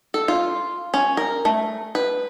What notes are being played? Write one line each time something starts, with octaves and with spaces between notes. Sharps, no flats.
A4
F4
C#4
A#4
A3
B4